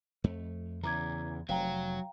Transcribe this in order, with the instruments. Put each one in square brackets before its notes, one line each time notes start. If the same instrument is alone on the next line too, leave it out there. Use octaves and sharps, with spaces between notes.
[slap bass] F2 A3
[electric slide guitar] E2 [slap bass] C#3 E3 [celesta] A#5 D6 G#6
[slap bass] F1 [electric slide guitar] F#3 [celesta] F5 G5 A#5